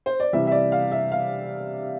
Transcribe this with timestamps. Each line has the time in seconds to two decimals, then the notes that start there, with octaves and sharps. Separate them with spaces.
0.06 C5
0.20 D5
0.33 C3 E3 G3 E5
0.47 E5
0.52 D5
0.72 F5
0.92 E5
1.12 F5